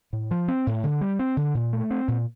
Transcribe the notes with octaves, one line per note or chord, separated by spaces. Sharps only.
A2
F3
C4
A2
D3
G3
C4
D3
A#2
A3
C4
A#2